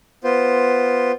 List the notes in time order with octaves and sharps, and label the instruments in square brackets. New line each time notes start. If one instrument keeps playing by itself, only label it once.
[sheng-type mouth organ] B3 F4 C5